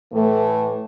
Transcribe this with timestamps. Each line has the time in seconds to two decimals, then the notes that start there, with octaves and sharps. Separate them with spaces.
0.13 A2 E3 A3